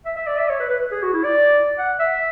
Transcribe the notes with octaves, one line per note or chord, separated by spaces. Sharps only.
E5
E5
D5
E5
C#5
B4
B4
G#4
F#4
E4
D5
F#5
E5